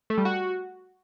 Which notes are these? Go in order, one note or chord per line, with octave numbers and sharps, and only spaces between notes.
A3
G3
F#4